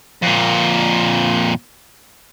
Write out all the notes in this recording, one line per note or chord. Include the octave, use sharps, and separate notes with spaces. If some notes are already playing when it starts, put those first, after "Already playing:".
F2 A#2